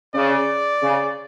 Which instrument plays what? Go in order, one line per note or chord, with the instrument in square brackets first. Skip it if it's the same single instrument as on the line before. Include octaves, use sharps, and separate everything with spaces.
[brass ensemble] C#3 [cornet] D5
[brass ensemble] C#3